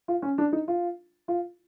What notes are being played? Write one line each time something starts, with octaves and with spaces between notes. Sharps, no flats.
F4
C#4
D4
D#4
F4
F4